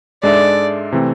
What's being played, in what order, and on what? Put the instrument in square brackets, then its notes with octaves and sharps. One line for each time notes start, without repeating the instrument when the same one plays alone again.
[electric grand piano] G#2 G#3 D4 A4 E5 [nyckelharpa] D5
[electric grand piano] C3 E3 A3 C4